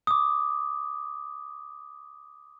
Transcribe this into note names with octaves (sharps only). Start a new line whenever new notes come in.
D6 D#6